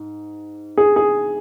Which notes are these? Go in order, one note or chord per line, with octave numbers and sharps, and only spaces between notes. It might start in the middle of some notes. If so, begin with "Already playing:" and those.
Already playing: G#2
G#4
G#4